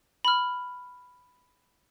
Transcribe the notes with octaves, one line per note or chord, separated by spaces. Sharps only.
B5 F6